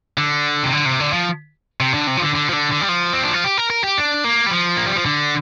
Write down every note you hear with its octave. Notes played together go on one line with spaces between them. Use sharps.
D3
C3
D3
C3
D3
F3
C3
D3
C3
F3
D3
D3
F3
D3
D3
G3
F3
C4
D4
F4
G4
A#4
A#4
G4
D4
A#3
G3
F3
A#3
G3
F3
D3